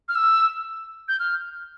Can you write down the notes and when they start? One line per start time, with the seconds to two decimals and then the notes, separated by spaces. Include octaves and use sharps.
0.08 F6
0.15 E6
1.08 G6
1.19 F6